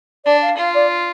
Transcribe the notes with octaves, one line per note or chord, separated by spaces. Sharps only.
D4 D5
F5
F4 F5
D5